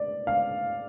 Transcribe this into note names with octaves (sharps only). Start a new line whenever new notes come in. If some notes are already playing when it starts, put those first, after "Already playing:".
Already playing: D5
F5